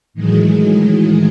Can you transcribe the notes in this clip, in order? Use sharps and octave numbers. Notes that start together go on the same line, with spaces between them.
A2 D#3 E3 F#3 G#3 G#4